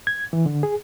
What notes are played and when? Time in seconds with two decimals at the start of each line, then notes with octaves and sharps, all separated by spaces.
0.07 G#6
0.33 E3
0.46 D3
0.63 G#4